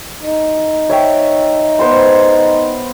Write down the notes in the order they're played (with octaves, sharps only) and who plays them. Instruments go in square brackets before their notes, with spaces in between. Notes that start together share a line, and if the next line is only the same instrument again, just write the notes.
[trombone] D#4
[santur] C#5 E5 G5
B3 C5 C6